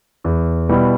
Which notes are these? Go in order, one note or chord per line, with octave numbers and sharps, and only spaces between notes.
E2
B2 G3 B3 E4